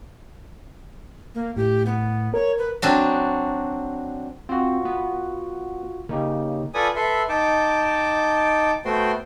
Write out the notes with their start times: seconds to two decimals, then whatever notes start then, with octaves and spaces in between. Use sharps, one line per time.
1.35 A#3
1.57 A2 G4
1.86 B3
2.34 A#4 C#5
2.58 B4
2.82 F#3 C4 D4 F#4
4.49 C4 F4 F#4
4.85 B3
6.09 C#3 A#3 D#4 G4
6.74 F4 A4 B4 D5 G#5 D#6
6.96 A4 B4 E5 C6
7.29 D#4 G5 A5 D6
8.85 A3 B3 F#4 C5 G5 C6